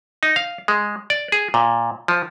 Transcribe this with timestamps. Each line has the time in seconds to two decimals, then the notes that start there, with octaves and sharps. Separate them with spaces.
0.23 D#4
0.36 F5
0.68 G#3
1.10 D5
1.32 G#4
1.54 A#2
2.08 F3